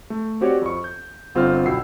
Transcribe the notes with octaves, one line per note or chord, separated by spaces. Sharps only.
A3
C4 F#4 G4 C#5 D5
F2 C#6
G6
G1 C4 F4 A4 G5 F6
B1 B2 E4 G5 E6 C7